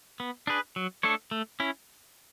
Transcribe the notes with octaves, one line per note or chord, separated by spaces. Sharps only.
B3
D4 G#4 B4
F#3
A3 D4 A4 C#5
A3
C#4 E4